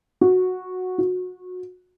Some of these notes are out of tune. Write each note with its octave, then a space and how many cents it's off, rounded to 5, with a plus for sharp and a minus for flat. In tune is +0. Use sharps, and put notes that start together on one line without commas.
F#4 -10
F#4 -25